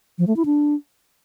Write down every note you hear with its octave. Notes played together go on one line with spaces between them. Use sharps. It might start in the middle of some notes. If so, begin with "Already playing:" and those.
F3
A3
E4
D4